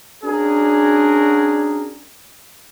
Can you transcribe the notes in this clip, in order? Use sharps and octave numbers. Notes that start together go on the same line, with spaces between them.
C#4 D4 F#4 G#4 A#4